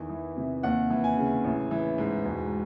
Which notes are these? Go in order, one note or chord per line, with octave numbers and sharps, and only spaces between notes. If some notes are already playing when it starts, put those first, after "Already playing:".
Already playing: E2 D#3
E3
C3
D#2 F#5
E3
G#5
C#3
A1
E3
G#2
E1